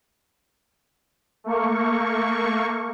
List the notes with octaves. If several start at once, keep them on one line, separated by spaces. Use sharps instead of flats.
A3 A#3 C#6